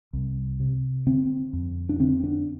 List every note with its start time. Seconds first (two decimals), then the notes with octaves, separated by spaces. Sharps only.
0.13 C2
0.60 C3
1.07 D3 C4
1.53 F2
1.89 D4
2.00 D3 C4
2.24 D4